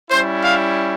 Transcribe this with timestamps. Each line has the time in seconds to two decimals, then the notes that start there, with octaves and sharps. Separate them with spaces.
0.10 G3 C#4 E4 C5
0.42 F5